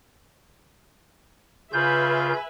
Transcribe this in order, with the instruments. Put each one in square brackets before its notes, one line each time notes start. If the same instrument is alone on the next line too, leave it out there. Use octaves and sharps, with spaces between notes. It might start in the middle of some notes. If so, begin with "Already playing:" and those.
[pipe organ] C#3 F4 G6 [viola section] B4 E5 G#5